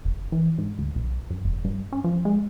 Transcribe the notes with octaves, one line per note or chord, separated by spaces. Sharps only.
F#1
E3
G#2
D2
B1
F#2
F1
G2
C#4
F3
G#3